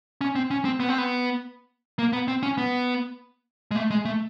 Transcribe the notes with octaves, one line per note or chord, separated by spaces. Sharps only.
C#4
C4
C#4
C4
B3
C4
B3
A#3
B3
C4
C#4
B3
G#3
A3
G#3
A3